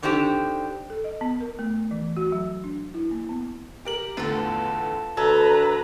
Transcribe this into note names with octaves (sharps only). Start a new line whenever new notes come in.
D3 D#3 C4 D4 G4
A4
D#5
B3
A#4
A3
E3
F#4
F#3
D4
E4
A#3
B3
G4 A#4 F#7
E2 A2 D3 F4 A4
D2 A4 B4 A#5 G#6